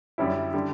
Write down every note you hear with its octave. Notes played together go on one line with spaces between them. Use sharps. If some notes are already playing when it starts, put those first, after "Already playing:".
F#2 D3 G3 C#4 E4
D3 G3